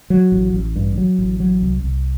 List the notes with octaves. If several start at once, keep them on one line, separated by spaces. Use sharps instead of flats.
F#3
A1
A1
G2
F#3
A1
F#3
C2
C2